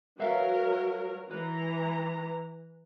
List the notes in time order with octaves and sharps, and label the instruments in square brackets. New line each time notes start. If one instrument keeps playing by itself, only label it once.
[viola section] F#3 A#4 [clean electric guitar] B4 E5 F5
[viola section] E3 A#5 [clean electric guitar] B4